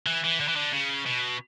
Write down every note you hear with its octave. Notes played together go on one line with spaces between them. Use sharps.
E3
E3
D3
E3
D3
C#3
B2